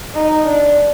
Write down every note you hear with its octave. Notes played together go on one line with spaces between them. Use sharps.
D#4
D4